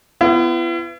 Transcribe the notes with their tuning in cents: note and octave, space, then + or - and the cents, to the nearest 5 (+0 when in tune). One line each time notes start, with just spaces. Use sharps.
B3 +25 E4 +45